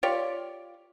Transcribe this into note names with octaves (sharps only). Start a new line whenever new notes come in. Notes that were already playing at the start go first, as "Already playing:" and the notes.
F4 G4 C#5 D5